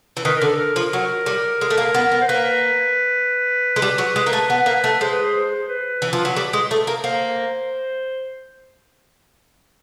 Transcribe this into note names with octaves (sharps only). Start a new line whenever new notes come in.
E3
D#3 B4
A#4
D3
A4
A#4
F3
F#3
G3
G#3
A3
A#3
B3
B3
C5
A#3 B4
G#3
G3
F#3
G#3
A#3
A3
B3
A#3
A3
G#3 C5
B4
C5
B4
E3
F3
F#3
G3
G#3
A3
A#3
A#3 C5